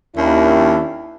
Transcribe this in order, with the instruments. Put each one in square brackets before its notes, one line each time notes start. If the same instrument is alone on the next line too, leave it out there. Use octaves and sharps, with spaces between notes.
[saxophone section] D#2 [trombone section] C#4 D4 E4